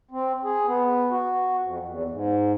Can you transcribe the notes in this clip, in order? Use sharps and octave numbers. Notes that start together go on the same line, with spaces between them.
C4
G#4
B3
F#4
F2
E2
G#2